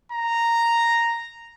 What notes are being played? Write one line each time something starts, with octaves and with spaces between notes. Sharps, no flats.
A#5